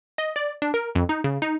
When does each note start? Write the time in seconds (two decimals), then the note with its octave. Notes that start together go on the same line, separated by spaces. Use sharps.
0.18 D#5
0.36 D5
0.62 D4
0.74 A#4
0.95 F2
1.09 D#4
1.24 C#3
1.42 D#4